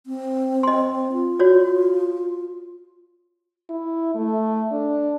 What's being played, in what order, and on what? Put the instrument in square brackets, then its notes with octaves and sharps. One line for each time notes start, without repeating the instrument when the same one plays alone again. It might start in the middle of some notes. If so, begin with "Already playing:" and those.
[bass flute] C4
[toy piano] D#5 C6
[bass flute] F4
[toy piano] F#4 C#5 D5
[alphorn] E4
A3
D4